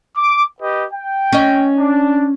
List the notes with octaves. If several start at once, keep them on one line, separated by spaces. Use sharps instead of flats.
D6
G4 B4 D#5
G5
C#4 D#5
D4